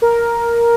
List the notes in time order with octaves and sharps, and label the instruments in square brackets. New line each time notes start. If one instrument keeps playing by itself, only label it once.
[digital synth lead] A#4